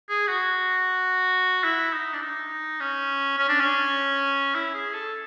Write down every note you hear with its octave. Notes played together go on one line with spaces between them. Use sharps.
G#4
F#4
E4
D#4
D4
D#4
C#4
C#4
D4
C#4
E4
G#4
A4